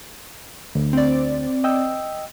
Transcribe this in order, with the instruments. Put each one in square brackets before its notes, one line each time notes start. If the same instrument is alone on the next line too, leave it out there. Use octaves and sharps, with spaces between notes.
[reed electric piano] D2
[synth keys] C4 D5
[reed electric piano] D#5 G5 E6